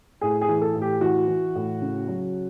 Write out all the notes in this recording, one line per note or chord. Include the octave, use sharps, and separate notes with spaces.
A2 G#4
G#4
E3
A4
A2
G4
E3 F#4
E3
A2
C#3
F#3